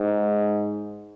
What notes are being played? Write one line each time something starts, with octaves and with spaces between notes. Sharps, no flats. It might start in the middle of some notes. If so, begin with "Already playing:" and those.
Already playing: G#2